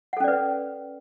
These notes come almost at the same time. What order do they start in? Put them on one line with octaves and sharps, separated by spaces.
F#5 A4 C#4 D5 B4